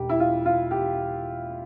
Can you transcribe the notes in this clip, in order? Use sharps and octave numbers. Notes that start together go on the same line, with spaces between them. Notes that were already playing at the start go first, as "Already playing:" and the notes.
Already playing: E1 G4
E4
F4
F4
G4